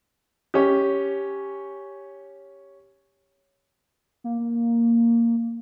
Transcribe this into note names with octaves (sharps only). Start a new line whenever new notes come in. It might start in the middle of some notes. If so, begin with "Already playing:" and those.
C#4 G4
A#3